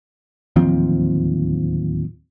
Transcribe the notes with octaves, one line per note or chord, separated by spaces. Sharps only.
D1 D#2 F3 C4